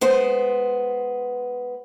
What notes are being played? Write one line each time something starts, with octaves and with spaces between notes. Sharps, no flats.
G#3 B3 C5